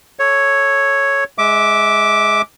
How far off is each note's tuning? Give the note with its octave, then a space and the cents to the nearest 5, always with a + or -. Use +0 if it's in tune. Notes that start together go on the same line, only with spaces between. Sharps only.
A4 +0 C#5 +0
G#3 +5 E5 -20 D6 +0